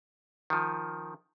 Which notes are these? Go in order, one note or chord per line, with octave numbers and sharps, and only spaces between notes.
D#3 F3